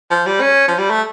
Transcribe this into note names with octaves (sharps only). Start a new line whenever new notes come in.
F3
G3
C#4
F3
G3
A3